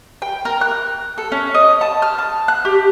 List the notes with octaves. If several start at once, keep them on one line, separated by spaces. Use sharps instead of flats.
G5
A#4
F#6
A4
C#4
D#5
A5
F6
A5
F#6
G4